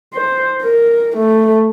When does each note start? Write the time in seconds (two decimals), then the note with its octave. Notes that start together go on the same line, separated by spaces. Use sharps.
0.14 C5
0.63 A#4
1.17 A3